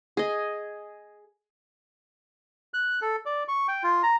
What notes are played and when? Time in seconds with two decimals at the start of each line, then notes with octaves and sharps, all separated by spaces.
0.17 G#4 D#5
2.74 F#6
3.02 A4
3.26 D5
3.48 C#6
3.68 G5
3.84 F4
4.03 A#5